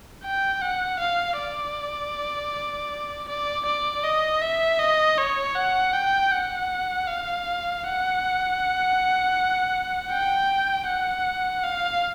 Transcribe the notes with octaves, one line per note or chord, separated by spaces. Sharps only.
G5
F#5
F5
D5
D5
D5
D#5
E5
D#5
C#5
F#5
G5
F#5
F5
F#5
G5
F#5
F5